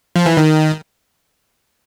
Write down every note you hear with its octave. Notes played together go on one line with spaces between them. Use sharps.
F3
E3
D#3